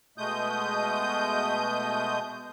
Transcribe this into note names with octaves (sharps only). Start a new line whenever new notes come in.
B2 G#3 A3 D#6 G6